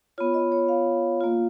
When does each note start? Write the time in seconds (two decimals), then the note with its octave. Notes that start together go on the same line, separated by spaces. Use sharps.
0.18 B3 F4 C#5
0.34 D#5
0.52 C#5
0.69 F5
1.21 A#3 F4